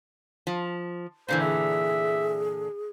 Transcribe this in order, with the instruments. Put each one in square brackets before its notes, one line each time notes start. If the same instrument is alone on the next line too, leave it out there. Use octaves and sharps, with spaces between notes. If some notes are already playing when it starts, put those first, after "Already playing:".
[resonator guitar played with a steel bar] F3
[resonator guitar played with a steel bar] A#2 D3 E3 [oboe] C5
[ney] G#4 [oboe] E5